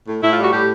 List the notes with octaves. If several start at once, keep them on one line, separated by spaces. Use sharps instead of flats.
A2
A2 E4
G3 F4
F#4
A2 G4